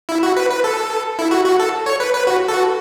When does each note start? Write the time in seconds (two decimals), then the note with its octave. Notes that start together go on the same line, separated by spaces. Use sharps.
0.09 E4
0.23 F#4
0.37 B4
0.50 B4
0.64 A4
1.19 E4
1.31 F#4
1.46 F#4
1.60 A4
1.86 C#5
2.00 B4
2.14 B4
2.27 F#4
2.48 A4
2.54 F#4